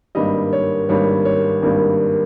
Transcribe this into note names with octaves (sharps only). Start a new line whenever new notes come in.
G#1 G2 G3 A#3 D#5
C#5
G#1 G2 G3 A#3 C#5
C#5
G#1 G2 G3 A#3